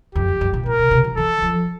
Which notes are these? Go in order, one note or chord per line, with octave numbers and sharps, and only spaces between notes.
F2 G4
F2
G2
A#2
A#2 A#4
C3
C3
E3
E3 A4
F3